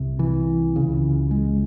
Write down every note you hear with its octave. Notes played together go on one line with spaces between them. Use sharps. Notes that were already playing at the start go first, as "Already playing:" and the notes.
Already playing: C2 C3
E3
C#2 C#3
G#3